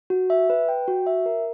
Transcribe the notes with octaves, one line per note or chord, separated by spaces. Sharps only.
F#4
E5
B4
G5
F#4
E5
A#4